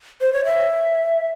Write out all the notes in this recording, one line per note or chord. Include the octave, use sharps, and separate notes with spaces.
C5
C#5
E5